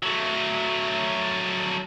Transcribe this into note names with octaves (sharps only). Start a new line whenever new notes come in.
F#3 A3